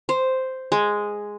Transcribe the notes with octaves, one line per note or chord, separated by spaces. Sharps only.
C5
G#3